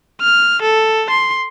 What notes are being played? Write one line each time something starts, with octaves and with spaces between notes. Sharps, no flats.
F6
A4
C6